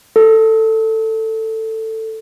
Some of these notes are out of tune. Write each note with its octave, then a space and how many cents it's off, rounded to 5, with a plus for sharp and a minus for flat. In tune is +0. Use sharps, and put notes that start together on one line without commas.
A4 +15